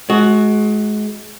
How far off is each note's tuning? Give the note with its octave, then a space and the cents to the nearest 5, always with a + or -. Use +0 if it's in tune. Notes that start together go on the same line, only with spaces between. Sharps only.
G#3 +30 F#4 +0